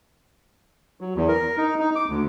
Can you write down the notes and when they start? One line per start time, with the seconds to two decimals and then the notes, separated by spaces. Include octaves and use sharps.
1.01 F#3
1.16 E2
1.28 A#4
1.57 D#4
1.79 D#4
1.95 D6
2.09 D2